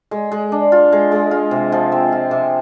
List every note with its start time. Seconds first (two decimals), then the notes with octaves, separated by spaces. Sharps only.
0.11 G#3
0.32 G#3
0.52 D4
0.72 F4
0.92 G#3
1.12 G#3
1.31 F4
1.51 C3
1.72 F3
1.92 C4
2.12 F4
2.31 C3